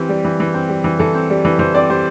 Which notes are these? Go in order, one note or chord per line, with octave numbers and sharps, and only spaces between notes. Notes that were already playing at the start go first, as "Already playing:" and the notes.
Already playing: E3 C4 G4
G3
E3
E3
C4
G3
E3
E3 A4
C4
G3
E3
E3 C5
C4 D5
G3 C5